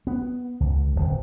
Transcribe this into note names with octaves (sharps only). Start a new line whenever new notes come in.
B3
C#2
D1